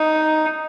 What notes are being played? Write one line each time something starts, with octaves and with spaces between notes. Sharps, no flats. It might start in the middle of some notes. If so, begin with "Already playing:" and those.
Already playing: D#4